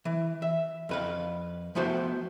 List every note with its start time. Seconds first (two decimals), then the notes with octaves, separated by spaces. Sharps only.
0.05 E3
0.42 E5
0.89 F2 B4 F5
1.75 F3 A3 B3 F#4 C5